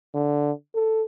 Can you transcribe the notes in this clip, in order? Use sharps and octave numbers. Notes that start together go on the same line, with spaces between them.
D3
A4